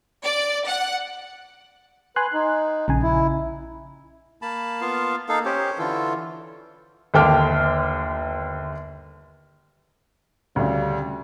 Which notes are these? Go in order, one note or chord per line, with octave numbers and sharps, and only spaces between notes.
D5
F#5
B4 G#5 C6 F#6
D#4
A#1 C#3 G#5
E4
A#3 A5 B5
B3 F4 F5
A#3 D#4 A4 F5
C#4 G4 C5 C#5
D3 E3 F4 A4
G1 D#2 A4 G5 D6 F6
D2 C#3 G3